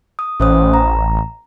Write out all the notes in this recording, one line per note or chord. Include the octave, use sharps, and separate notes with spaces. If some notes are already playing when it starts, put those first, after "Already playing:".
D#6
A1 C#4 C5 D#6
A#5